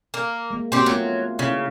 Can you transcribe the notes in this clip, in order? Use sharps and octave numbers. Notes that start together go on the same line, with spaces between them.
A#3
G#3 A#3
A#3 C4 C#4 F#4 G4
F#3 A3 B3 F4
C#3 E4 F5